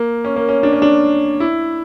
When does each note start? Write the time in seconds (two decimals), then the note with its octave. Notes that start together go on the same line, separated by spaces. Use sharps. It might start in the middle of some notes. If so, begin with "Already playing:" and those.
Already playing: A#3
0.25 C#4
0.36 A#3
0.49 C#4
0.63 D4
0.73 C#4
0.82 D4
1.40 E4